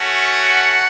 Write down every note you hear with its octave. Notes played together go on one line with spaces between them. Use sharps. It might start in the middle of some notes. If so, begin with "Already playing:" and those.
Already playing: A3 C#4 F#4
F#5